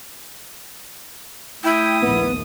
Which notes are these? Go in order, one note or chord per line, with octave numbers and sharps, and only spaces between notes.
A3 E4 G5 D#6
A#1 D#2 B3